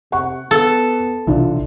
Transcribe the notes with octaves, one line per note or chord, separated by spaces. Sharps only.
C3 F#5 C#6
B3 A4
B1 C3 E3 D4 E4 F4